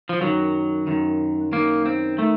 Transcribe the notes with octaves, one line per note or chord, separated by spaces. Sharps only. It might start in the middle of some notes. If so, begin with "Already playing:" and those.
F3
F#2 D#3 F#3
F#2 D#3
F#2 D#3 A#3
C4
D#3 A3